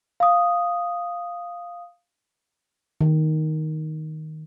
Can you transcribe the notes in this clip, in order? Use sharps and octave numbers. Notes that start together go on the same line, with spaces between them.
F5 D#6
D#3